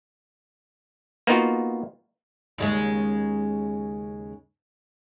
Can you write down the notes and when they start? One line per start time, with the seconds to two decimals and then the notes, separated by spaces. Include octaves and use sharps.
1.27 A#3 B3 D#4 F4 F#4
2.58 D#2 C#3 G#3